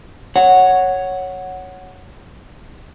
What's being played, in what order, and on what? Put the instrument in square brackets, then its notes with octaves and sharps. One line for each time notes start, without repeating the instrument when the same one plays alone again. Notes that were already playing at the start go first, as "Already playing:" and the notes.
[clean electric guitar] C#5 F#5